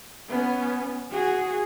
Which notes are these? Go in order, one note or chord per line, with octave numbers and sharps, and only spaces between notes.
B3 C#4
F#4 G#4